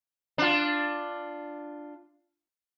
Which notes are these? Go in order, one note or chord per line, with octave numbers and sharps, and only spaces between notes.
D4 F4